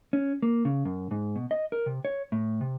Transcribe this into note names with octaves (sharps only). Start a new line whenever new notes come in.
C#4
A#3
C#3
F#2
G#2
B2
D#5
A#4
C3
C#5
A2
C3